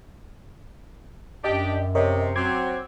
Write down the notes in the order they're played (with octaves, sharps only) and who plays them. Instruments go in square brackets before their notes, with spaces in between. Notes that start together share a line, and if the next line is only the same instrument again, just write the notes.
[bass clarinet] F#2 [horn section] D4 G4 [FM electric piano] D#5
[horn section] C3 [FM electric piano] A#4 C#5 D#5
[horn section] F#3 C4 [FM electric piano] C6 D6 G#6